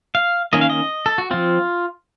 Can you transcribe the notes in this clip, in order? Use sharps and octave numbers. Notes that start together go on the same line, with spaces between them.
F5
D#3 A#3 C#4 D#5
F5
D#5
A4
F#4
F3 C4 F4